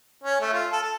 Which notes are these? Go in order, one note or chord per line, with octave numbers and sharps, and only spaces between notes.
C#4
A3
F4
A4
A4